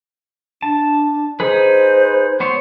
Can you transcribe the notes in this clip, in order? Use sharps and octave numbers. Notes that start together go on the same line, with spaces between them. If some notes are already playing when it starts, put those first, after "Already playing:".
D4 A5
D#4 G#4 B4 C5
B3 C5 C#5